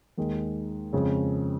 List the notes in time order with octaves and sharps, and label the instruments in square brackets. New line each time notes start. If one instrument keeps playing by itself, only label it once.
[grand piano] D#2 D#3 G#3
F2 C#3 G#3